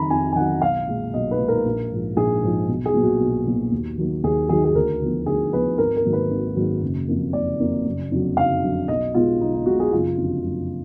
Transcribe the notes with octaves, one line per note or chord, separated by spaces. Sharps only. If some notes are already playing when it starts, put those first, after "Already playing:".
Already playing: F2 D#3 F#3 A#5 B5
F2 G#5
G#5
D#3 F#3 F#5
B1 F5
A#2 G#3
B1 D#5
B4
A#2 G#3
A#4
A#1
G#2 F3
A#1 G#4
G#2 F3
B1
G#4
A#2 F#3 B3
F#4
B1
A#2 F#3 B3
D#2
D#3 F#3 A#3
D#2 G#4
D#3 F#3 A#3 G#4
G#4
D2 A#4
D3 F3 B3
D2 G#4
D3 F3 B3 B4
G#1 A#4
A#4
G#2 D#3 F#3 A#3
B4
G#1
G#2 D#3 F#3 A#3
F#1
F2 F3 A#3
F#1 D5
F2 F3 A#3
F#1
F2 D3 F#3
F#1 F5
F2 D3 F#3
B1 D#5
B2 G#3 B3 F4
B1 D#4
D#4
B2 G#3 B3 F#4
G#4
F#1 F4
F2 D3
F#1